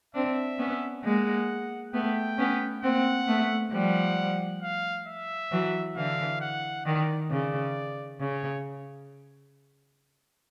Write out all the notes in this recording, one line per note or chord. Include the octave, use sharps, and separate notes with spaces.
C4 D4 E5
B3 C#4
G#3 A#3 F#5
A3 B3 G5
B3 C#4
A#3 C4 F#5
A3 B3
F3 G3 F#5
F5
E5
E3 F#3
D3 E3 F5
F#5
D#3 D5
C#3 D5
C#3 C#5